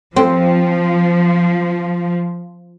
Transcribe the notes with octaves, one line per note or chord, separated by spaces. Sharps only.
F3 C4